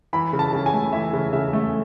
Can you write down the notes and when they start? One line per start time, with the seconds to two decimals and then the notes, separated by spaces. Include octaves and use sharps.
0.13 E3 B5
0.33 C#3
0.39 A5
0.53 C#3
0.66 G#5
0.73 A3
0.93 E3 E5
1.13 C#3
1.33 C#3 E5
1.53 A3